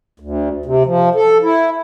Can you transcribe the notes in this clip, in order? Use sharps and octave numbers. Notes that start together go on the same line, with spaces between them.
D2
C3
F3
A4
E4